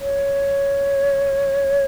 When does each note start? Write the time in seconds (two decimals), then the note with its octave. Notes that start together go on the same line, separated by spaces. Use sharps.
0.01 C#5